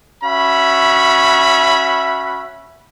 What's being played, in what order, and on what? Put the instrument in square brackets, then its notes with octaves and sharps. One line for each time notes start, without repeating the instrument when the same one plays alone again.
[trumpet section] C#4 F#4 E5 B5